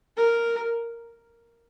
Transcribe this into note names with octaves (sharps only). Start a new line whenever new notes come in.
A#4